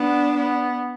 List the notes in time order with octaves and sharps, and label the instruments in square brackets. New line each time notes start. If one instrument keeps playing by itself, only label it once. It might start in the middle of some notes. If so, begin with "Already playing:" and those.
Already playing: [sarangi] B3 [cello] D4
[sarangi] B3